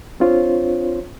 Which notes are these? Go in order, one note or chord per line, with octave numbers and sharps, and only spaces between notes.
C4 D4 F4 C5 C#5